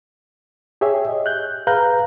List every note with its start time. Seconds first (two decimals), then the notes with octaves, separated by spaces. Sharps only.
0.81 G4 G#4 C#5 E5
1.08 D#5
1.26 F#6 G6
1.67 G#4 B4 F5 A#5 F#6 G6